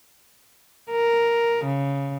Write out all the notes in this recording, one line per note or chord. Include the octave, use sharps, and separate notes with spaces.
A#4
C#3